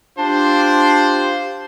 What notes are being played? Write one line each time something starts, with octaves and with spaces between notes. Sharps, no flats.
D4 F4 G4 C5